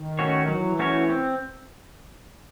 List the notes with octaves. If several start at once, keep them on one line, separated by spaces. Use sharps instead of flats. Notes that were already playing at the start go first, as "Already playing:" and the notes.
Already playing: D#3
A3 C#4 F#4 C#5
E3 F#3
A3 C#4 F#4 C#5
C4